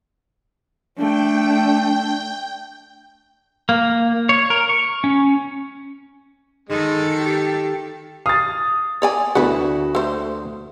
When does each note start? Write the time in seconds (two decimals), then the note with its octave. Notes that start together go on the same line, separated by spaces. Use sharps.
0.98 A3 D4 G5
3.69 A#3
4.29 C#5
4.50 A#4
4.69 C#6
5.04 C#4
6.69 D#3 G#3 A4
7.20 G4
8.26 F5 D#6 A6
9.02 C#5 D5 G#5
9.35 D2 B3 E4 F#4 B4 F#5
9.95 A3 C5